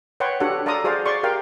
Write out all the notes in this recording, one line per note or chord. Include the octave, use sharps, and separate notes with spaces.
B4 C#5 F#5 G5 C6 C#6
D4 F#4 G4 A4 C#5 F#5
A4 D5 F5 A#5 C6 D#6
F#4 G#4 C5 D5 F5
D5 C6 C#6
G4 A#4 F5 G5